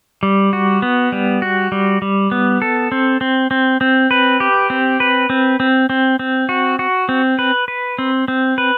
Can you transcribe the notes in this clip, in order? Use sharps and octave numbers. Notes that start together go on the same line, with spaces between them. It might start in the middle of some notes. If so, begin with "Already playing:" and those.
G3
F#4
B3
G3
F#4
G3
G3
B3
A4
C4
C4
C4
C4
B4
G4
C4
B4
C4
C4
C4
C4
F#4
F#4
C4
B4
B4
C4
C4
B4